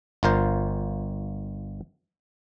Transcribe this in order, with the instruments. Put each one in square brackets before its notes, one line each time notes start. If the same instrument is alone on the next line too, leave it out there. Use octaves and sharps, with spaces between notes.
[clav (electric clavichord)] G1 F4 A#4 C5